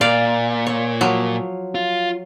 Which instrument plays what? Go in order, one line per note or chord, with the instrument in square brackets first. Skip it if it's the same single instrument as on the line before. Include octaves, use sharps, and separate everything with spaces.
[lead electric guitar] A#2 [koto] D5 F5
[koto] C#5
F3 F#3
[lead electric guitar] F4